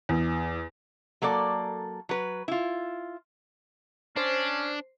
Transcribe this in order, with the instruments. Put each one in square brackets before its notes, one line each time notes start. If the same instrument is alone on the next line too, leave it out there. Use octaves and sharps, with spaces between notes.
[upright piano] E2
[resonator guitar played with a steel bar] F#3 A#3 A4 D5
F#3 B4
E4 F4
[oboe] C#4 [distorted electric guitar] D4 [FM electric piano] C5 C7